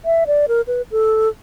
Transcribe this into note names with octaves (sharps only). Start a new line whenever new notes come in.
E5
D5
A#4
B4
A4